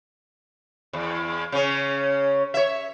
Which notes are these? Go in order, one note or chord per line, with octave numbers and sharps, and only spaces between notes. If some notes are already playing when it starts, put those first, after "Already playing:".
E2
C#3 C#4
C#5 E5